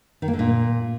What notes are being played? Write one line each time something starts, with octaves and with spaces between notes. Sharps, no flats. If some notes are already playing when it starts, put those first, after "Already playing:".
D#3
A#3
D3
A#2